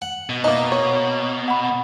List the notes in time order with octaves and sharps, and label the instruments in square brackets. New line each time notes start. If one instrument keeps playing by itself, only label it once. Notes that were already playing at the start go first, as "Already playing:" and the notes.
[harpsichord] F#5
[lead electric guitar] B2
[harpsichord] A#3 D#5 [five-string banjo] D#4 E4
[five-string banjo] C#5
[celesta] F#5 B5